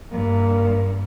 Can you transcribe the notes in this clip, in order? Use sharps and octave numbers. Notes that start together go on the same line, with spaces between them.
G2 A#3